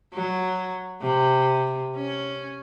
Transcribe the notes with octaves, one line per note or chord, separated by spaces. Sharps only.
F#3
C3
C#4